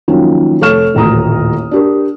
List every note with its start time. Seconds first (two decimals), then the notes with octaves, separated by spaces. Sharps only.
0.08 D#3 F3 F#3 A#3 C#4
0.61 F1 A4 C#5 C#6 F6 E7
0.95 D#1 A1 D2 A#5 D#6
1.71 D4 G4 A#4